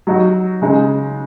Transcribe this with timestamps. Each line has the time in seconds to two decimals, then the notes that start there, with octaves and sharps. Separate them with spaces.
0.07 F#3 D#4 F#4
0.62 C#3 G#3 D#4